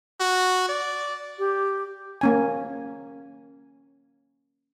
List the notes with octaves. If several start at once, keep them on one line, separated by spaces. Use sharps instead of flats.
F#4
D5
G4
A#3 C#4 G#5